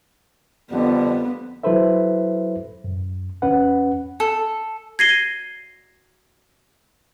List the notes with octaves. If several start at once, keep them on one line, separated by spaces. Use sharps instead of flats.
F2 D3 G3 B3
F#3 E4 A4 B4 C5 E5
F#2
E2 C#4 B4 F#5
A4
G#6 A#6 C7 D#7 G7